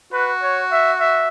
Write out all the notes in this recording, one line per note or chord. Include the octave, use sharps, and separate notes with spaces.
F#4 B4
C#5
E5
E5